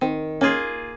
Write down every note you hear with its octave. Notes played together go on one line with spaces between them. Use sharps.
D#3 C4
A#3 C#4 F4 G#4